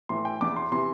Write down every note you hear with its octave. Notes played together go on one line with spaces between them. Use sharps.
A2 E3 C6
G5
E2 E3 D6
C6
C3 E3 C6